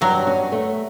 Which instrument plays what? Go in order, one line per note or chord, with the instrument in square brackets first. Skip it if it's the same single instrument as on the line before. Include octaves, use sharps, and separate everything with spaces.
[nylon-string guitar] G2 [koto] F#3
[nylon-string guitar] C#4
A3